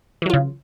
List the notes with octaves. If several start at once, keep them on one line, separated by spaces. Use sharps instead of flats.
C#3 E3 F#3 F4